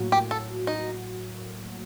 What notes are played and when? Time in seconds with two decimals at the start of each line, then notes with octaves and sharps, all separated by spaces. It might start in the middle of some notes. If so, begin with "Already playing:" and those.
Already playing: A2 F#3 A#3 F#4
0.12 G4
0.31 A4
0.67 D#4